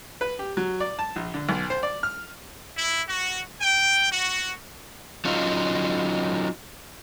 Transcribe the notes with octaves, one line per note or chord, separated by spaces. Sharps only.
B4
G4
F#3
D5
A5
A#1
D3
B1
C5
D5
F6
E4
F#4
G5
F#4
F#3 C#4 D#4 F4